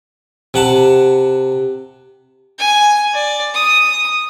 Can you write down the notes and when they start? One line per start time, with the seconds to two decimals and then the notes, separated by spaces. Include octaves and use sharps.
0.54 C3 F#5 A5
2.59 G#5
3.14 D5
3.54 D#6